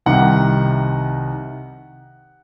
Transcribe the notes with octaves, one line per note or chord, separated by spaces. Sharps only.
C2 C3 D#3 F#5